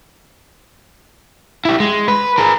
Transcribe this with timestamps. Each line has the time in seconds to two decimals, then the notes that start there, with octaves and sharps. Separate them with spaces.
1.65 E4 G4
1.80 G#3
2.08 B4
2.38 G#4 A#4